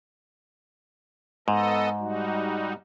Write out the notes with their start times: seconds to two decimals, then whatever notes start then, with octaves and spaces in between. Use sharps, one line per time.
1.48 G#2 B3 A4 D#5
1.99 G3 D#4 F#4